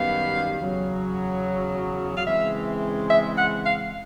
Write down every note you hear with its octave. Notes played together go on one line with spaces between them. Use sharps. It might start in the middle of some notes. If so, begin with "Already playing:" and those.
Already playing: F#2 D#3 G3 B3 F5
E2 C#3 F#3
F5
C#3 E3 G#3 C4 E5
E5
F#5
F5